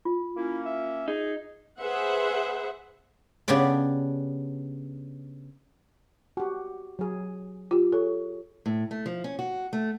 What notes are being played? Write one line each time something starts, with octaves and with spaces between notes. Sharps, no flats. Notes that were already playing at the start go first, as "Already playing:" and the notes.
F4
A#3 C#4 E4
E5
D#4 G#4
G#4 B4 C5 E5 F#5
C#3 B3 D4 G4 D5
F#4 G4
F#3 G#4
F4 G4
G#4 A4 C#5
A2
A3
F3
C#4
F#4
A3